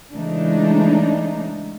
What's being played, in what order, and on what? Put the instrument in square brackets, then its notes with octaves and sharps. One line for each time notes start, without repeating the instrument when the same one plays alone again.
[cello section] C#3 E3 G#3 A3 D4 D#4